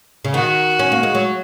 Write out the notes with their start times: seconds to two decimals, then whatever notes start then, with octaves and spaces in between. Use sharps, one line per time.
0.25 C#3
0.34 D#3 F#4
0.79 C#4
0.92 A#3
1.03 G#3
1.15 F#3